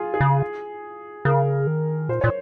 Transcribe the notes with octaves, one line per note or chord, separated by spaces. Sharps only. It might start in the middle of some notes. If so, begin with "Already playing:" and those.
Already playing: F4 G#4
G#4
C#3
C#3 A#4
D#3
A#2 C5
A#2 C#5